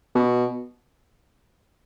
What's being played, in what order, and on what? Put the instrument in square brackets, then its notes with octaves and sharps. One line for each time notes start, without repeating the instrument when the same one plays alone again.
[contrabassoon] B2